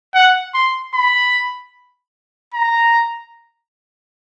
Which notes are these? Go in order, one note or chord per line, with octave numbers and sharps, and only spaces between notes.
F#5
C6
B5
A#5